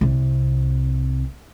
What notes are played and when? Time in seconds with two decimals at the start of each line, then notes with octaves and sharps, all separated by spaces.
0.01 C2 C3